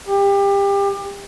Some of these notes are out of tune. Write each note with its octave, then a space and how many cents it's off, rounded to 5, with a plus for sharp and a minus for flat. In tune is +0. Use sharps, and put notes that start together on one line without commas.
G4 +25